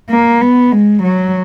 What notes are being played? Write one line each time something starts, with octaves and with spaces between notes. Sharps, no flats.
A#3
B3
G#3
F#3